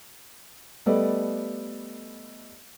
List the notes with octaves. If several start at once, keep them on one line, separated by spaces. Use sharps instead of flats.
G3 A3 B3 A4 D5 D#5